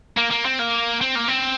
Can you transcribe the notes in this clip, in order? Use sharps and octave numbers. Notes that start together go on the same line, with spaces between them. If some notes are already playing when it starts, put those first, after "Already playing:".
A#3
A#3
C4
A#3
C4
A#3
C4